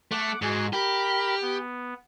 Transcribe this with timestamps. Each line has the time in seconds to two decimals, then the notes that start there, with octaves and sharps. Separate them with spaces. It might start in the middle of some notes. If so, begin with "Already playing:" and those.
0.11 A3 F#5 D6
0.42 G#2 F#4 G#4
0.73 G4 A#4 B5
1.42 B3